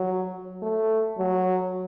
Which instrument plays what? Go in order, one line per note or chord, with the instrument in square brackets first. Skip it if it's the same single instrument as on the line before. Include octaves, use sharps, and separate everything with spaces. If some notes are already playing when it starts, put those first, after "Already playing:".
Already playing: [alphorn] F#3
A3
F#3